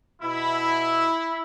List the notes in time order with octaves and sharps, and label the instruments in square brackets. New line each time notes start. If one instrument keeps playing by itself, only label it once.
[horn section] B2 E4